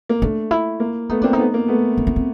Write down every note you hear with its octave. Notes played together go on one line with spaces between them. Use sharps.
A#3
A3 D4
E4
A#3
A3 B3 D#4
A#3 C4 D4
D#4
A3 B3
A#3
A3 B3
D4
C#4
C4